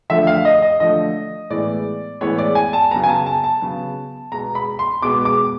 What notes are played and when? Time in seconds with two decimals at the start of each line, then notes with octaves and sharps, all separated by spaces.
0.10 D3 F3 A3 E5
0.27 F5
0.45 D#5
0.62 D#5
0.80 D3 F3 A3 D#5
1.50 A2 E3 G#3 B3 D5
2.21 A2 E3 G#3 B3 C#5
2.38 D5
2.55 G#5
2.73 A5
2.91 C#3 F#3 B3 A#5
3.04 G#5
3.09 A5
3.26 A5
3.44 A5
3.61 C#3 F#3 B3
4.32 B2 G#3 B3 A#5
4.55 B5
4.79 C6
5.02 B2 G#3 B3 D6
5.25 D6